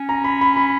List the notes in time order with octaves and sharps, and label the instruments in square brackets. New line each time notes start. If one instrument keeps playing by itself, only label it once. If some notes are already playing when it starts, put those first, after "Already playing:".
Already playing: [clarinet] C#4
[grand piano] A#5
B5
B5
B5